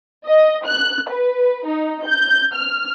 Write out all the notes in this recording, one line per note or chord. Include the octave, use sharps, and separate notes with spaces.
D#5
F#6
B4
D#4
G6
F6